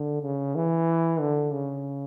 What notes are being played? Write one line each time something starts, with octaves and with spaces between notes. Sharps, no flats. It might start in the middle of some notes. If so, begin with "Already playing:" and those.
Already playing: D3
C#3
E3
D3
C#3